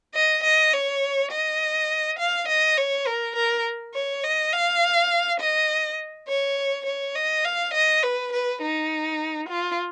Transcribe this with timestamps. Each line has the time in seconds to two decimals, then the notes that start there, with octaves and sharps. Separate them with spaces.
0.15 D#5
0.44 D#5
0.73 C#5
1.32 D#5
2.19 F5
2.49 D#5
2.77 C#5
3.07 A#4
3.36 A#4
3.94 C#5
4.24 D#5
4.53 F5
5.40 D#5
6.28 C#5
6.86 C#5
7.15 D#5
7.45 F5
7.74 D#5
8.03 B4
8.32 B4
8.62 D#4
9.49 F4